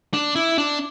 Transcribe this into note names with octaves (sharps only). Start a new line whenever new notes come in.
D4
E4
D4